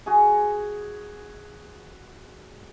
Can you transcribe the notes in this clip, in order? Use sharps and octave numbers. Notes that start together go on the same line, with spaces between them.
F#4 G#4